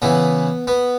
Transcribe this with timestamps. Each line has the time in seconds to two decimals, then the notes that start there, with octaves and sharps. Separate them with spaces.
0.02 C#3 E3 B3
0.67 B3